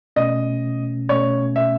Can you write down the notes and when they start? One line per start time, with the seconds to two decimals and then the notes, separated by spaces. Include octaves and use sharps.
0.16 B2 A3 C#4 D#5
1.09 B2 A3 C#4 C#5
1.56 E5